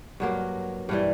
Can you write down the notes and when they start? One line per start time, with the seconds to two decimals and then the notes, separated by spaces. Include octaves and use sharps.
0.20 G2 F#3 A#3
0.89 G2 E3 G3